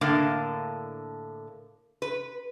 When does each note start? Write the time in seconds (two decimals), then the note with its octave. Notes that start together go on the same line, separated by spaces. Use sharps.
0.01 A2 D3 A#3 D4 A#4 F5
2.02 B4